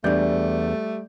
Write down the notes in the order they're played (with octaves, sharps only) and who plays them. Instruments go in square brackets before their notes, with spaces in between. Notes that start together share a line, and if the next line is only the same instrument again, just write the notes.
[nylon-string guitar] E2 D4 [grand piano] G3 D5 G6 [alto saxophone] A3